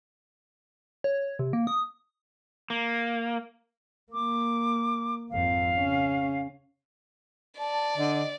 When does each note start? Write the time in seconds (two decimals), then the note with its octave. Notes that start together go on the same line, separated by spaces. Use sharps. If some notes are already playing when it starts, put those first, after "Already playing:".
1.04 C#5
1.39 C3
1.53 A#3
1.67 D#6
2.70 A#3
4.13 A#3 D6
5.30 G#1 F2 F5
5.78 C#3 C#4
7.59 D5 A5
7.98 D3 D#5